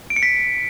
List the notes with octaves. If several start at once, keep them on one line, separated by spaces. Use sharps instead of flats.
D7
C#7
B6